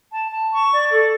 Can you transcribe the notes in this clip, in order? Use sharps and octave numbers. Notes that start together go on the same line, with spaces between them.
A5
A5
C#6
D5
A4